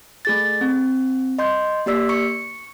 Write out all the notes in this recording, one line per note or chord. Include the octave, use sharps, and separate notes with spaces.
A3 G#4 A6
C4
D#5 C6 G6
A#3 G4 D5 E6 B6
C#6 C#7